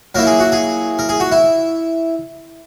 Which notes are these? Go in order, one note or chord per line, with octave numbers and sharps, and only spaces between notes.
F#3 A#3 E4 A#4
G#4
F#4
G#4
A#4
G#4
F#4
E4